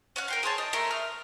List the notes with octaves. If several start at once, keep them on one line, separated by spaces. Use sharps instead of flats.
C#4 F5 F#5 F#6
A#4 G5 C6
G#4 C5 C#5 A5
D#5
A3 A#4 E5 C6
F6